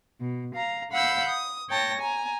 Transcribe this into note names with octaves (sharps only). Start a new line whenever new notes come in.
B2
F5 A#5
F5 F#5 B5 E6 G6
D#6
C#5 G5 A5 A#6
G#5 A#5